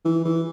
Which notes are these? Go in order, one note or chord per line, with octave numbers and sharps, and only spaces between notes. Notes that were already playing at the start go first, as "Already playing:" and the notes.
E3
E3